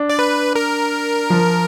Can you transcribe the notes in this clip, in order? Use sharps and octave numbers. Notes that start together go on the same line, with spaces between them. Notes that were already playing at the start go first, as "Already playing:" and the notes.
Already playing: D4
D5
B4
A#4
F3